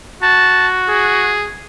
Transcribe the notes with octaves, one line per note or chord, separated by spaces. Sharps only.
F#4 A5
G#4